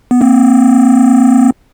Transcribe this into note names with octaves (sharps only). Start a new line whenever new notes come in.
B3
A#3 C4